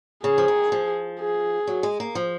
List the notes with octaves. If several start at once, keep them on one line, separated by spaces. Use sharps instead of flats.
C#3 G#4
F3
D#3
F3
G#4
F#3
G#3
A#3
F3